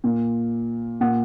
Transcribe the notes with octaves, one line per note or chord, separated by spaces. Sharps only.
A#2
A#2 F#5